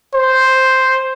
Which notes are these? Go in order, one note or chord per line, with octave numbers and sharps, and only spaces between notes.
C5